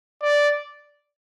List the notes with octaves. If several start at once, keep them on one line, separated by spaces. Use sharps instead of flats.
D5